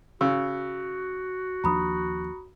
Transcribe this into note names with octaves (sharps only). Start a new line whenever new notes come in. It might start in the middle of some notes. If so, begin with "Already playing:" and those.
C#3 F#4 E6
D#2 F3 D4 A#5 B5 D#6